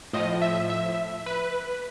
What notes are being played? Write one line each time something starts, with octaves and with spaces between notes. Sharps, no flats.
A2 F3 D#5
E5
E5
B4